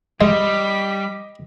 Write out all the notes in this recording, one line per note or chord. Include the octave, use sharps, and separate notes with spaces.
G3 G#3 D#5 D6 B6